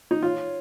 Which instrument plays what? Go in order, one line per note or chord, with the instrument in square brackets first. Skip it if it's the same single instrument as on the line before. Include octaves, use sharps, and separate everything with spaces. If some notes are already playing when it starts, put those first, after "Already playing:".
[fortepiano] D#4
[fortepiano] F4 [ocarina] C#5